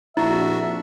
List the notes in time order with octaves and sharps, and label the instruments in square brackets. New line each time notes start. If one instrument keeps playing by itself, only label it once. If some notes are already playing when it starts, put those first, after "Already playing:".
[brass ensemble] A#1 F2 [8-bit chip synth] D4 F#4 [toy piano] E4 [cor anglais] E5